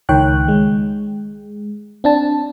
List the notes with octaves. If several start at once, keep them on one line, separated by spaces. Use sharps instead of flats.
C#2 D#3 C#5 G5 F#6
G#3
C4 D4 A5